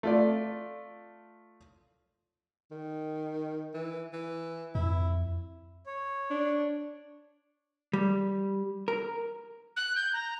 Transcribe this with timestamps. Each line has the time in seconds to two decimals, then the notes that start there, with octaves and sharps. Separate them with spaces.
0.03 A3 F4 D5
2.71 D#3
3.74 E3
4.13 E3
4.75 F2 E4
5.86 C#5
6.30 D4
7.93 G3
8.88 A#4
9.76 F#6
9.96 G6
10.13 A#5